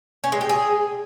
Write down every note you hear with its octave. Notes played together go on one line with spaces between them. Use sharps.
C#4
G#3
G4
G#4